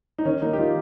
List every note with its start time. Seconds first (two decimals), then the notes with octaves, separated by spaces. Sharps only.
0.18 D#4
0.25 D#3 C#4
0.42 A#3 D#4
0.53 G4
0.58 D#3 F4